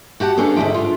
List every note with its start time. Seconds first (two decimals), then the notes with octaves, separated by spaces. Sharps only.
0.20 F#4 G4 F#5 A5
0.37 B3 C#4 D4 G#4 A4 C#5
0.56 D2 G#2 F3 E4 G5
0.74 F4